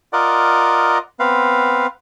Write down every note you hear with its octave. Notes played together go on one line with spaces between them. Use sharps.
F4 A#4 D5 D#5 F#5
B3 C4 B4 F5